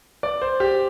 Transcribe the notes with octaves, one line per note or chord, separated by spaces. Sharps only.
D5
C5
G4